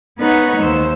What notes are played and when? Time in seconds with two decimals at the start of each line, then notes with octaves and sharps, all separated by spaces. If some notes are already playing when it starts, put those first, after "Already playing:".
0.19 B3 D#4 B4 C#5 F#5
0.63 D#2 C5 E6